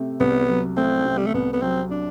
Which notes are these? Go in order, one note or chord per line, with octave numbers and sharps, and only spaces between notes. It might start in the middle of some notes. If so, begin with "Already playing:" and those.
Already playing: C3 A3
C2 B3
F#3
A3 C4
C3
G3
A3
C2 B3
B3
F#3 C4
D4